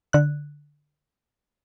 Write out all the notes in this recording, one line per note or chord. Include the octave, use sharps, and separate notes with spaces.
D3 F#6